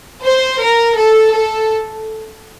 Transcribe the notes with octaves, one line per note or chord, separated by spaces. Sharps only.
C5
A#4
A4
A4